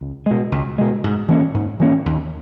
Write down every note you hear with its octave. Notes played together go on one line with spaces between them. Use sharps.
C#2
B2 G#3
C#2
B2 G#3
G#2
E3 A#3 C#4
G#2
E3 A#3 C#4
D#2